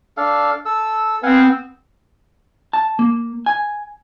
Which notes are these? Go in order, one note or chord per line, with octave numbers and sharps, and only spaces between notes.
D4 A4 F5
A4 E6
B3 C4 F5 F#5 G#5
A5
A#3
G#5